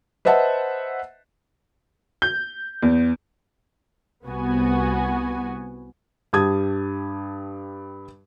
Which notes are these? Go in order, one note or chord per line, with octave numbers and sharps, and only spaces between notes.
B4 C5 D#5 E5 F#5 A5
G6
E2
C2 B3 F#4 G#5
G2 G4 A5 D#6 G#6